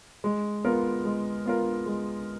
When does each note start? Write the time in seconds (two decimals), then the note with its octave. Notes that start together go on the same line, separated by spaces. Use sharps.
0.24 G#3
0.64 B3 F4 A#4
1.05 G#3
1.46 B3 F4 A#4
1.86 G#3